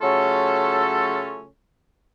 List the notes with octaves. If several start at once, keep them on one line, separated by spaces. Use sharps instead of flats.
C#3 F#3 A3 C#4 F4 A4